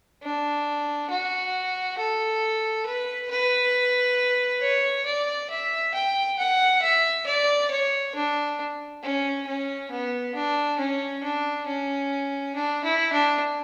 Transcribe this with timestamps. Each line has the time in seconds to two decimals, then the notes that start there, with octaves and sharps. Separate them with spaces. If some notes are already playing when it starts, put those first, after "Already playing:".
0.23 D4
1.10 F#4
1.98 A4
2.86 B4
3.31 B4
4.62 C#5
5.06 D5
5.50 E5
5.94 G5
6.39 F#5
6.82 E5
7.27 D5
7.71 C#5
8.15 D4
9.03 C#4
9.47 C#4
9.91 B3
10.35 D4
10.78 C#4
11.23 D4
11.67 C#4
12.55 D4
12.84 E4
13.13 D4